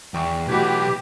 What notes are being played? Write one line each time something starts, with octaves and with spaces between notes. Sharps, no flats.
E2 G5 C#6
B1 E3 A3 F#4 G4 B4